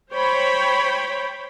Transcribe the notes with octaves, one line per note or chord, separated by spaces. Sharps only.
C5 C#5 G5 B5